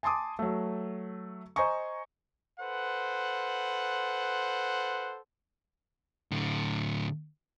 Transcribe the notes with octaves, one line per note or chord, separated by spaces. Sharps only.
G#5 A5 C6 D6 D#6
F#3 A3
C5 D#5 G#5 A#5 C#6
F4 A4 B4 C5 F#5
A2 D3